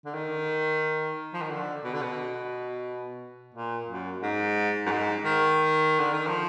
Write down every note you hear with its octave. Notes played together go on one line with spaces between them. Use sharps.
D3
D#3
F3
D#3
D3
B2
D3
B2
A#2
F#2
G#2
F#2
G#2
D#3
D3
D#3
F3